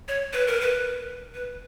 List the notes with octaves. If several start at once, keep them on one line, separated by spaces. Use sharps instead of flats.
C#5
B4
A#4
B4
B4